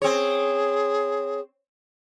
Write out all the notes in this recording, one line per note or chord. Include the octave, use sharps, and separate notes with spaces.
C4 G#4 C#5